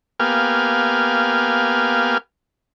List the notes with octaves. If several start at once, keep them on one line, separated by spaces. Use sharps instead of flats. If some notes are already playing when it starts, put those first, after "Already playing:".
A#3 B3 G4 F5 G#5